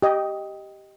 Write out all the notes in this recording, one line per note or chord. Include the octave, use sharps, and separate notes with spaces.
G4 D#5